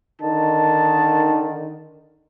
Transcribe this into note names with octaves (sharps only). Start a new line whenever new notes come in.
D3 D#3 D#4 A5